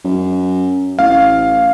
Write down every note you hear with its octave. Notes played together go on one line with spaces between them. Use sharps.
F#2
A1 F5